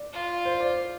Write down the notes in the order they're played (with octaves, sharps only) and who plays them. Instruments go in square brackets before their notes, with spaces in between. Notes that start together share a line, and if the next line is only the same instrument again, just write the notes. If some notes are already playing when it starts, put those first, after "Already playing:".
Already playing: [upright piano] D5
[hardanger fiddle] F4
[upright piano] C5
D5